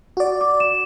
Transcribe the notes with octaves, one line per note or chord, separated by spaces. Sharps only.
F#4 D5
D6
E7